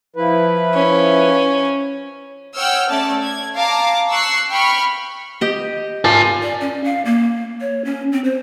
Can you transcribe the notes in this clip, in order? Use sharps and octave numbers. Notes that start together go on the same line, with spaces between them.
F3 E4 B4
C#4
C#5 F#5 G5 E6 F6 G6
A3 C#4 D5 A5
G#6
F5 A5 A#5 D6
C#6 E6 F#6 C7
G5 B5 C#6 F6
G4 D#5
F4 A#4 G#5 A5 A6
D5
C#4
F5
A#3
C#5
C#4
C4
C5